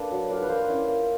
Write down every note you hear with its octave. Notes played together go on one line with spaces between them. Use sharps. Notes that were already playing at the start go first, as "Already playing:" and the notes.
Already playing: A#3 D4 A4 B4
F#3
A#3 D4 F4 A#4
B4
A#3 A#4 C5
C#4 E4
A#3